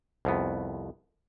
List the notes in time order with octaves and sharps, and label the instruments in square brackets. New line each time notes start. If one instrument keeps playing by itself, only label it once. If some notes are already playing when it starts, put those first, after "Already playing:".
[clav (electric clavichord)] C2 F2 B3